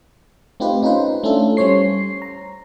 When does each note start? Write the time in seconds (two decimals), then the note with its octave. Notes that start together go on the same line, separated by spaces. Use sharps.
0.60 A3 C4 D#4 F4 G4 B4
0.83 C#4 D#4 F4 B4 C5
1.23 A3 C#4 D4 E4 F4 A4
1.57 G3 C#4 C5 C#5 C7
2.22 A#5